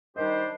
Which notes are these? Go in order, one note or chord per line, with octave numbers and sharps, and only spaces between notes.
D#3 G3 D4 G4 C5 D#5